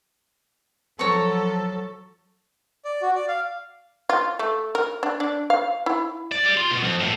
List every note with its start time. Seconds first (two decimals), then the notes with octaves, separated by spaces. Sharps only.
0.99 F3 F#3 A4 C#5 A#5 C#6
2.85 D5
3.02 F#4
3.15 D5
3.28 F5
4.09 F4
4.39 A3
4.75 A#4
5.03 D4
5.20 D4
5.50 F5
5.86 E4
6.31 D5
6.44 G3 D5
6.57 F4 C6
6.71 B2
6.83 F2
7.01 C#2 A2